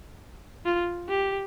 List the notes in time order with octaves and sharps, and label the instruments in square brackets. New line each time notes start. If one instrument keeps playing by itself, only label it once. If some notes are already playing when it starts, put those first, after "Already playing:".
[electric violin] F4
G4